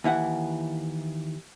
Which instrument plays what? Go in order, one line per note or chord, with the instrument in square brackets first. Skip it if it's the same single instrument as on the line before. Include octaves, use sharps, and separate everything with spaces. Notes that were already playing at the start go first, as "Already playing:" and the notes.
[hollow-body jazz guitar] D#2 E3 E4 F#5